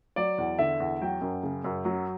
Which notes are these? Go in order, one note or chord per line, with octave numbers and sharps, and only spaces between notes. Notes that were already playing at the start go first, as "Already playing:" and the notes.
F#3 D5
E2
D3 E5
E2
F#3 G5
F#2
C#3
F#2
F#3